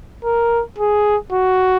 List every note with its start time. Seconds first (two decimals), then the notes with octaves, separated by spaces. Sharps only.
0.25 A#4
0.79 G#4
1.32 F#4